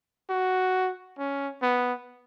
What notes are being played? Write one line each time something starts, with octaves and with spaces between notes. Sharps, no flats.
F#4
C#4
B3